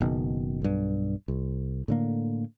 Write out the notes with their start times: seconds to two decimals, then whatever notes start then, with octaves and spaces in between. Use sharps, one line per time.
0.01 F#1 B2 D#3
0.62 B1 G2
1.28 C2
1.88 A2 D3 A#3